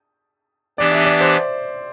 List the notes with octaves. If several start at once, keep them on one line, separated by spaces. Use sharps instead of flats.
E3 B3 D4 G4 D5
E5
D5
C5